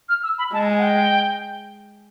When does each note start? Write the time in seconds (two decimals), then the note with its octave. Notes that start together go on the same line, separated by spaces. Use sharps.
0.09 F6
0.23 E6
0.38 B5
0.53 G#3 A5
0.69 G#5
0.79 F#5
0.83 G5